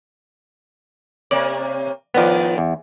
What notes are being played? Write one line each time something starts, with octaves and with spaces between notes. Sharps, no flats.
C3 A#3 C#5 D5
A2 D#3 F3 B3 D5
E2